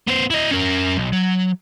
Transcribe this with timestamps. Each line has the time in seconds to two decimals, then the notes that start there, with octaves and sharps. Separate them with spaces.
0.07 B3 C5
0.30 E4 D#5
0.51 C#4 A#4
0.97 B1
1.13 F#3